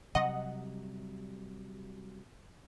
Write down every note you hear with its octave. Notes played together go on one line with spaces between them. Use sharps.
C3 F#3 G3 D#5 F#5